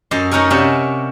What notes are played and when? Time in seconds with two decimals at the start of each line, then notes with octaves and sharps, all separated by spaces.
0.11 F#2 A4 D#5 A5 C6
0.31 A3 C#4 D#4 F#4 A#4 G#5
0.50 C3 C#4 D5 E5 G#5